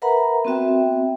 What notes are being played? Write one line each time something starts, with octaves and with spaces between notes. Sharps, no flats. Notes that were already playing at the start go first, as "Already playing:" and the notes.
A#4 B4 E5 F#5 A#5 B5
B3 C4 F#4 E5 G5